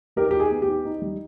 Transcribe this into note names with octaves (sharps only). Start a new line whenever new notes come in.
D#4 G4 A#4
D#4 G4
G#4
B3
G4
D#4
D#4
G3